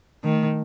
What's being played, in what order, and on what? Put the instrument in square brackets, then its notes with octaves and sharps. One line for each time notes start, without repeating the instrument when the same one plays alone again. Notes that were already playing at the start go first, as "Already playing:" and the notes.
[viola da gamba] D#3 [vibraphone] A3